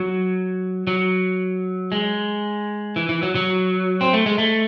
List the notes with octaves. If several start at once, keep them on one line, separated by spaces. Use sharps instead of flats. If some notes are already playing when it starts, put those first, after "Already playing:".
Already playing: F#3
F#3
G#3
E3
E3
F#3
F#3
C4
A3
G#3
A3